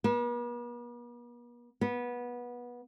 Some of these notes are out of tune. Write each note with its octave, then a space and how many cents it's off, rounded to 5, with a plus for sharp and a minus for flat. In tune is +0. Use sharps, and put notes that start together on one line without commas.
B3 -45
B3 -20